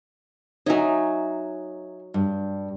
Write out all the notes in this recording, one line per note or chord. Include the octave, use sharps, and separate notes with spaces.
F#3 D#4 C#5 E5 G#5
G2